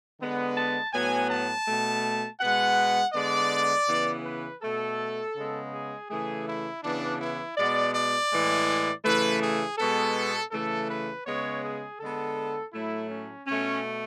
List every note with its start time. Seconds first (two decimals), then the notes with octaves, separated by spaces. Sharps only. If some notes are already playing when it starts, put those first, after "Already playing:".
0.19 D3 G#3 B3
0.56 A5
0.93 A2 F#3 B3 G#5
1.30 A5
1.67 B2 A3
2.40 B2 G#3 B3 F#5
3.14 D3 G#3 B3 D5
3.88 C#3 E3 B3
4.25 B4
4.61 B2 A3 A4
5.35 C#3 G#3 B3
5.72 G#4
6.09 C#3 E3 A3 G#4
6.47 E4
6.82 C#3 E3 B3 D4
7.20 E4
7.57 B2 G#3 B3 D5
7.94 D5
8.31 A2 E3 G#3
9.04 C#3 E3 A3 B4
9.41 G#4
9.78 B2 G#3 B3 A4
10.51 C#3 E3 A3 A4
10.89 B4
11.26 C#3 G#3 B3 C#5
11.63 G#4
11.99 D3 G#3 B3 A4
12.73 A2 F#3 A3 E4
13.10 C#4
13.47 B2 A3 C#4